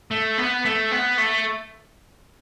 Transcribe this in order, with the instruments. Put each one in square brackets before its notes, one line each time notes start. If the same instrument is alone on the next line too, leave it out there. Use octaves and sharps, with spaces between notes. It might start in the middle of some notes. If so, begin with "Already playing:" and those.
[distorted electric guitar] A3
B3
A3
B3
A3